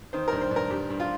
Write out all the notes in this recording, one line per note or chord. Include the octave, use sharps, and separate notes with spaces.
D#3 C5
G2 A#4
C5
G2
A#4
G2 G4
G2
F4